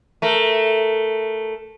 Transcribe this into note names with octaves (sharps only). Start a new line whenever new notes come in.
A3 A#4